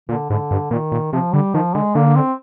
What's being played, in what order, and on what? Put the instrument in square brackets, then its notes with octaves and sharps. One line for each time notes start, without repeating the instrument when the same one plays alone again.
[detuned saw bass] A#2 [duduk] D3
[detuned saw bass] G#2 [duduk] D3
[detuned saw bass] G2
[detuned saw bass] A#2 [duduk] D#3
[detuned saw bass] A#2
[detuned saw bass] C3 [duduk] F3
[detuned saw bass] D3 [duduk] G3
[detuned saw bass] D#3 [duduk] F3
[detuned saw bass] D3 [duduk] G#3
[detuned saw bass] D3 [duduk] A#3
[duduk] C4